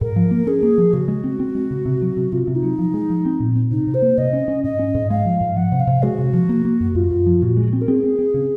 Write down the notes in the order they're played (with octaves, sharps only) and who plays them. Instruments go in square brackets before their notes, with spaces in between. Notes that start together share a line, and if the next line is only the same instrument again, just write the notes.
[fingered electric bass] G#2 [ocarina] A#4
[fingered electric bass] F3
A#3
[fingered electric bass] C#4 [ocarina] G#4
[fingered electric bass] A#3
F3
[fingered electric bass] C#3 [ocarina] F#4
[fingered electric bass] G#3
C4
C4
G#3
C#3
C3
F#3
C3
[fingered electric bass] C3 [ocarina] F4
[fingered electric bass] C3
[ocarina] D#4
[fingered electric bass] F#3
F3
G#3
F3
C4
A#2
C4
[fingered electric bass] C3 [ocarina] D#4
[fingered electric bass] C3
[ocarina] C5
[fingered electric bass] A#3
[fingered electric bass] C3 [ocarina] D#5
[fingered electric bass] C#4
C#4
[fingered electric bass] G#2 [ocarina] D#5
[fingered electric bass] C#4
G#2
[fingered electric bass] G#3 [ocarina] F5
[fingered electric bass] F3
G#2
[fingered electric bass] F3 [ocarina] F#5
[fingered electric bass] C3
[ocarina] F5
[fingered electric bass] C3
[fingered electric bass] G#3 [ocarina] F#4
[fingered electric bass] C3
F3
A#3
A#3
F#2
[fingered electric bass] F#2 [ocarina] F4
[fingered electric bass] F#2
F3
[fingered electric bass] A#2 [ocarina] F#4
[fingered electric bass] G#3
C4
[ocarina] A#4
[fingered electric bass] C4 [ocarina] G#4
[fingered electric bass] C4
C4
C#3